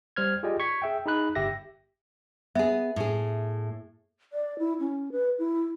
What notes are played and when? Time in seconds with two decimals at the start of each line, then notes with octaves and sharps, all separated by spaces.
0.16 G3 C5 F6 G#6
0.43 F4 G4 G#4 D5 D#5
0.60 C#6 G#6 B6
0.82 G#4 E5 G5
1.06 D#4 G#4 B5 F#6
1.35 G1 G4 E5 A#6
2.55 B3 G#4 E5
2.96 A2 G#4
4.33 D5
4.59 E4
4.80 C#4
5.12 B4
5.39 E4